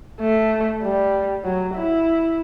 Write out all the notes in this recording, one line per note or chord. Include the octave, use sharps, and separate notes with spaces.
A3
G3
F#3
E4